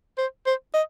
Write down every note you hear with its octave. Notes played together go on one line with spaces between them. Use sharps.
C5
C5
D#5